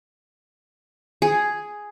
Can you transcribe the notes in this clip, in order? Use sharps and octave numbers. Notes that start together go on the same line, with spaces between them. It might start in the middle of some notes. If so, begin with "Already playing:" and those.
G#4